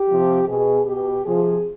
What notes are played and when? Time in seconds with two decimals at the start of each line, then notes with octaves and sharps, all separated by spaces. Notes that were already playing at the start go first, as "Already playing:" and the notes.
Already playing: G4
0.08 C3 F3
0.47 B2 G#4
0.86 B2 G4
1.25 C3 F3 G#4